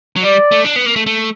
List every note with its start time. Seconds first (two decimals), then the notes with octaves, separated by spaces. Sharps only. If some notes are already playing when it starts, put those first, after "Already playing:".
0.16 F#3
0.23 G3 D5
0.52 A3
0.65 D4
0.76 B3
0.86 A#3
0.96 A3
1.06 A3